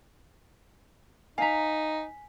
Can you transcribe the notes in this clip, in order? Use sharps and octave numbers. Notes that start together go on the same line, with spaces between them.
D#4 F5 G#5 A#5 B6